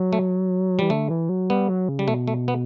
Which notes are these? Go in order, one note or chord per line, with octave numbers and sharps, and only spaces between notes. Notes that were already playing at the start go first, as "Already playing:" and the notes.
Already playing: F#3
A3
E3 G3
D3 A3
E3
F#3
G3 B3
F#3
C#3
G3
B2 A3
A3
B3